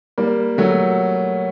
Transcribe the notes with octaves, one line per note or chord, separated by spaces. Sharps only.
G3 A#3
F#3 A3